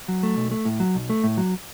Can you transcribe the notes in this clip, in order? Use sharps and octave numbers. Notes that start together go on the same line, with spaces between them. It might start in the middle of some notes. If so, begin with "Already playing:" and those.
F#3
A3
B1
A3
A2
F#3
B1
A3
A2
F#3